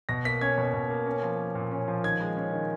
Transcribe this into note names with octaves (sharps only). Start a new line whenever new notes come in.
B2 A#6
A#3 B6
C#4 G#6
B2
B2
A#3
C#4
F3
A#3
A#2
C#4
F3
D#3 G#6
G#3
C#4
D#3